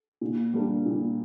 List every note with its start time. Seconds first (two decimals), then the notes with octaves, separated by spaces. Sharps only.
0.21 A#2
0.53 G3 A#3 D4
0.86 A#2